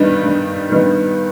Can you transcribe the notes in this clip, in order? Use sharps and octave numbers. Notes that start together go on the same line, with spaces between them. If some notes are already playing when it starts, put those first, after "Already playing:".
Already playing: G2 D#3 G3 B3 D#4
G2
D#3 G3 B3 D#4